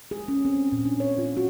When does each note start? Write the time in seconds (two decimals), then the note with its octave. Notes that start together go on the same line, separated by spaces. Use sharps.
0.11 G#4
0.28 C#4
0.45 C4
0.72 A#2
0.85 D4
1.00 C#5
1.18 F4
1.37 F#4